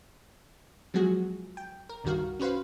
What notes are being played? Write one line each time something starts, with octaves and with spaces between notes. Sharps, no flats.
F3 F#3 G#3 B3 F#4 G#4
G5
A#4
C2 G2 D#3 F#4 A#4 F5
C#4 F#4 B4 C5 F5